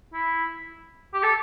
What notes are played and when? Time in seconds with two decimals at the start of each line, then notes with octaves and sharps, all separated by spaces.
0.13 E4
1.14 G4
1.23 A4